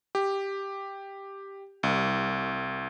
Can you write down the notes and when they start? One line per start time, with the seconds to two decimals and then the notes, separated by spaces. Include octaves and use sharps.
0.15 G4
1.83 C2